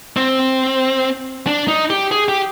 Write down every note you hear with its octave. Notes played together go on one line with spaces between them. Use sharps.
C4
D4
D#4
G4
G#4
G4